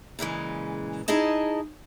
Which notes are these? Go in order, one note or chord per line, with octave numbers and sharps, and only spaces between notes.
A#2 C#3 E3 G#3
D#4 E4 G#4 D#5 A5